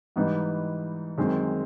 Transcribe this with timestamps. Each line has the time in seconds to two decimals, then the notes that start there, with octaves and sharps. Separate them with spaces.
0.16 G#2 E3 G3 B3 D#4
1.18 F#2 D#3 G#3 C4